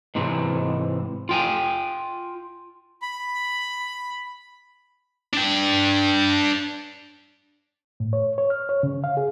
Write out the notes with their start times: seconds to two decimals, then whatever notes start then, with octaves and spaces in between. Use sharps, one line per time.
0.15 G#2 C3 E3
1.29 F4 G5 G#5
3.02 B5
5.33 D4 G5
8.00 A2
8.13 C#5
8.38 C#5
8.50 F6
8.69 C#5
8.83 C#3
9.04 F5
9.17 G#4